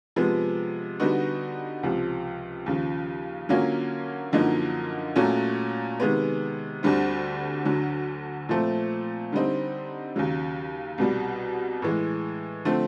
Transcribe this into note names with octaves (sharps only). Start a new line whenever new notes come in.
C3 F3 G#3 B3
D3 G3 B3 D#4 F#4
C#2 C3 F3
D#2 C#3 F3
D3 F#3 A#3 C#4 F4
F#2 D3 F3 A#3 D#4
A#2 F#3 A3 C#4 F#4
C3 D#3 G#3 B3
D2 D3 G3 C4
D2 D3 F#3
A#2 F3 A3 C4
D3 G3 C4 D#4
D#2 C#3 F#3
C2 B2 G3
A2 E3 G#3
D3 F3 A3 C4